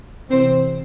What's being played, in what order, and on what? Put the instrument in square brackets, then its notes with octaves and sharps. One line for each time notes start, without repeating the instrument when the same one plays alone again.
[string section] C3 E3 C4 C5